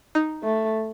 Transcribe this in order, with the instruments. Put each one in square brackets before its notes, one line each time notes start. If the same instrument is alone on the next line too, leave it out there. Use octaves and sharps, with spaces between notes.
[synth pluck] D#4
[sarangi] A3